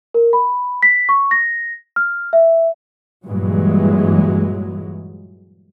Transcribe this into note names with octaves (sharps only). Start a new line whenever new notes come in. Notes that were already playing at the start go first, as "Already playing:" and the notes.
A#4
B5
B6
C#6
A#6
F6
E5
G2 A#2 E3 F#3 G#3